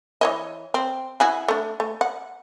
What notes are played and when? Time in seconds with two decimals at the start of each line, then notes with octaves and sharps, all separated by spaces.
0.21 E3 C#5 D#5
0.74 C4
1.20 E4 F#4 G#4
1.48 A3 D4
1.80 A3
2.01 F#5